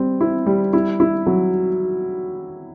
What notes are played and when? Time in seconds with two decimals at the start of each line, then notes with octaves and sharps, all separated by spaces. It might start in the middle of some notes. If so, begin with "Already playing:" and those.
Already playing: G3 C4
0.21 E4
0.46 G3
0.73 E4
1.00 E4
1.27 F#3